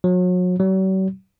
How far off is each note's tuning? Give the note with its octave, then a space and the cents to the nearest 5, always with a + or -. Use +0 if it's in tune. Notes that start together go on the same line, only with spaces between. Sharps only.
F#3 -35
F#3 +45